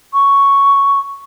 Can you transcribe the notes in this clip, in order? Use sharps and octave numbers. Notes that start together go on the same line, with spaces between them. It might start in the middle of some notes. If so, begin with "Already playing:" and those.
C#6